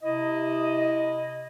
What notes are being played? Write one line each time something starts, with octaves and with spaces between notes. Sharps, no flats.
C3 E4 D#5